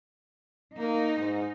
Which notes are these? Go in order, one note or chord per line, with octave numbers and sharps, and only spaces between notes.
A#3 D#4
G#2